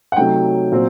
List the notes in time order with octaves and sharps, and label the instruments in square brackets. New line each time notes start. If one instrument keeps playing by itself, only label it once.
[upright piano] F#5
C3 F#3 A3 D#4 G5
A#2 F#3 C4